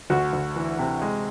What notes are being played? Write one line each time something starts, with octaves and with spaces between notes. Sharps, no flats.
D2 F#4
D2
E3
C3
G#3